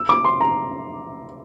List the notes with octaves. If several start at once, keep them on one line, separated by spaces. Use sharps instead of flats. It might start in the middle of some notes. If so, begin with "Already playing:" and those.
Already playing: E6
D6
C6
A#5